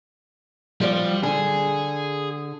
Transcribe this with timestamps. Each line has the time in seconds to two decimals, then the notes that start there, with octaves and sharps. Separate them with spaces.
0.81 F3 G3 F#4 D5
1.23 D3 G#4